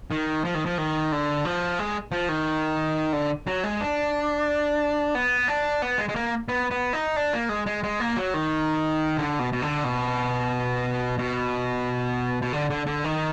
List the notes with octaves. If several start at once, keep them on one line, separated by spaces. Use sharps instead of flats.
D#3
F3
D#3
F3
D#3
D3
F3
G#3
F3
D#3
D3
F#3
G#3
D4
B3
D4
B3
G#3
G#3
A#3
B3
B3
D#4
D4
A#3
G#3
G#3
G#3
A#3
F#3
D#3
D3
B2
B2
D3
B2
B2
B2
D3
D3
D3
D#3